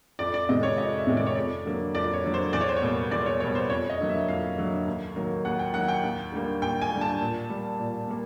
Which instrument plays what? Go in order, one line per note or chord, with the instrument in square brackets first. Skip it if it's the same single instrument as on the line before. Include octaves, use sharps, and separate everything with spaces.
[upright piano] F2 D5
D5
C3 D#3 G#3 D#5
C#5
F2 D#5
E5
C3 D#3 G#3
D5
C#5
F2 D5
D3 F#3 A#3
F2 D5
C#5
D3 F#3 A#3
C5
E2 D5
C#5
C5
C#5
B2 G3 A#3
E2 D5
C#5
B2 G3 A#3 C#5
C5
F2 C#5
D#5
D3 F#3 A#3
E5
F2 F5
D3 F#3 A#3
D#2
D#3 F#3 A#3
D#2 F#5
G5
D#3 F#3 A#3 F#5
G5
D#2
D3 G3 A#3
D#2 G5
G#5
D3 G3 A#3
A5
A#2
G3 A#3
A#2
G3 A#3